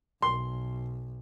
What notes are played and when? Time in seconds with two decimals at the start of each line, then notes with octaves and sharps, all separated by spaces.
0.22 B1 C6